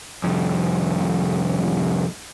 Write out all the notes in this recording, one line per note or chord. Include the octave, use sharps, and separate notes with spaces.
C2 F2